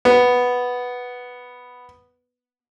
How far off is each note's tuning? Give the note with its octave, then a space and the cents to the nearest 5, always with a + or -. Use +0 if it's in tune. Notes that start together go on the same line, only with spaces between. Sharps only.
B3 +0